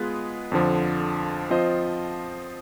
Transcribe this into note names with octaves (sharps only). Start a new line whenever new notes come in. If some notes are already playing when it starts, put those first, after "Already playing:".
Already playing: G#3 B3 F4 G#4 B4
F2 D3 F3
F3 C4 F4 C5 D#5